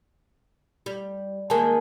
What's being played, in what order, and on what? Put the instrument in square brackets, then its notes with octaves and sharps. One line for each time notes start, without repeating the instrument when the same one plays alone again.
[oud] G3
[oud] D#3 G#3 A#3 [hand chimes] A#4 G#5 A5